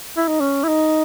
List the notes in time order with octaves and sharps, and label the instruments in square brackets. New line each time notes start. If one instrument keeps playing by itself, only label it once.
[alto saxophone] E4
D#4
C#4
E4
D#4